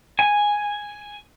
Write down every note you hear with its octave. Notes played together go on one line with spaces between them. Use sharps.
G#5